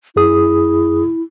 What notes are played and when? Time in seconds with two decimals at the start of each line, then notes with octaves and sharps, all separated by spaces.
0.16 F#2 E4 G#4 D#6